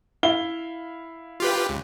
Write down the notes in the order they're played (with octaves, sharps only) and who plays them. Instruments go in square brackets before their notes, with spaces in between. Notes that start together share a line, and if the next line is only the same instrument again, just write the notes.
[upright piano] E4 F5 G7
[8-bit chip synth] F4 G4 B4
C#2